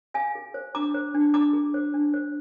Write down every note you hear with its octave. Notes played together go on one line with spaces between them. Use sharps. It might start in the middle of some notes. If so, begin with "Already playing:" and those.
G#4 F5 G#5
G#4
C5
D4 A#5 D6
C5
D4
D4 A#5 D6
G#4
C5
D4
C5